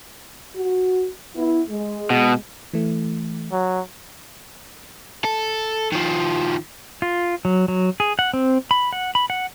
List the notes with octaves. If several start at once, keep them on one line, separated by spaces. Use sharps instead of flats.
F#4
B3 E4
G#3
B2
E3 A3
F#3
A4
D#3 F3
F4
F#3
F#3
G#4
F#5
C4
B5
F#5
B5
F#5